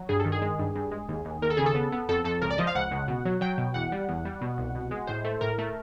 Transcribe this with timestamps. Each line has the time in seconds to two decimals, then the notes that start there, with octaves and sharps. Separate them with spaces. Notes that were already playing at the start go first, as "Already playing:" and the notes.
Already playing: F#3
0.09 G2 G#4
0.20 D#3 A4
0.32 G#4
0.42 G#3
0.59 G2
0.75 G2
0.92 G#3
1.09 D#2
1.25 D#2
1.42 D#2 A#4
1.50 A4
1.57 C#3 G#4
1.66 A4
1.75 B3
1.92 B3
2.09 F2 A4
2.24 F2 A4
2.42 C#2 A#4
2.50 D5
2.58 F3 D#5
2.67 F5
2.75 C#2 F#5
2.91 C#2
3.08 B2
3.25 F#3
3.41 F#3 G5
3.58 B2
3.74 E2 F#5
3.92 G3
4.09 E2
4.25 G3
4.41 B2
4.58 C2
4.75 B2
4.91 G#3
5.07 A2 C5
5.25 A3
5.41 A2 A#4
5.58 A3